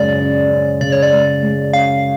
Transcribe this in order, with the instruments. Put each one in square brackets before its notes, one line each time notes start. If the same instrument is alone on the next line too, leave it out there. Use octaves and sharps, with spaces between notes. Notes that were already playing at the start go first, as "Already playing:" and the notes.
Already playing: [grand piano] F#2 C#3 G#3 C#4 [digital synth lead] D5
[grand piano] C#4
C#4
[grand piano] C#3 [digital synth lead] D5
[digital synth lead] C#5
D5
[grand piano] G#3
G#3
[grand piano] C#4 [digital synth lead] F5